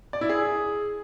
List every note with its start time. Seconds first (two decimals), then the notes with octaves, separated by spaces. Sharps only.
0.13 D5
0.21 E4
0.29 G#4